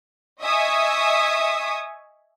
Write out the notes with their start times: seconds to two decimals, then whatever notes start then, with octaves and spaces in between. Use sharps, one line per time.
0.42 D#5 E5 G#5 C#6 D#6